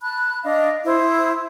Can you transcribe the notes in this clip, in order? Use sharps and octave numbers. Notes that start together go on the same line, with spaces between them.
A5 B5 F#6
D4 D#5 F5
E4 C5 D#6